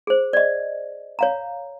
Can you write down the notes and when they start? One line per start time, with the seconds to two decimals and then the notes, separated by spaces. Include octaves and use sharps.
0.07 G#4 C5
0.33 D5 D#5
1.19 C#5 F5 A#5